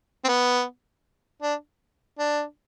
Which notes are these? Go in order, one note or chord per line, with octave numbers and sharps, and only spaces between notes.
C4
B3
D4
D4